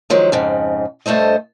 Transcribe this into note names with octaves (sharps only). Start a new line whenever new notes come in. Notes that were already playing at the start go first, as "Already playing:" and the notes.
D#3 F3 F#3 G#3
F2 G#2 C#3
G2 A3 A4 C5 D#5